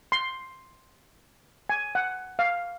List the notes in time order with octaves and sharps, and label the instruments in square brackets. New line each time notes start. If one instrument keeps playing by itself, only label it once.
[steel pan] C6
G#5
F#5
F5